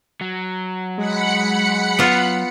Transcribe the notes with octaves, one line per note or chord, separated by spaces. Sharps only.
F#3
G#3 F#5 B5 C#7
B3 F4